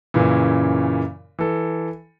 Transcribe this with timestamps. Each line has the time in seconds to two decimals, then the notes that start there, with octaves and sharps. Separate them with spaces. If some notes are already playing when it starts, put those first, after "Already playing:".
0.14 F#2 A#2 C#3 E3
1.39 E3 A4